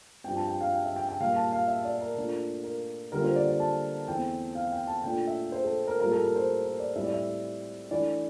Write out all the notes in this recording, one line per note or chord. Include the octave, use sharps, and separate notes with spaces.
G2 F3 C4 G5
A5
G5
F5
G5
E5
G5
G5
A#2 G3 A#3 F5
A5
F5
E5
D5
A#4
A#2 A3 D4 F4
A#4
D3 G3 A#3 F4 A#4
C5
D5
D5
A5
E2 E3 A3 C4 G5
F5
G5
A5
A#2 A3 D4 F4 G5
E5
C5
A4
A#4
A2 G3 A#3 F4 A#4
A4
A#4
C5
A#4
D5
A2 G3 C4 E4 E5
D5
E5
E3 A3 D4 D5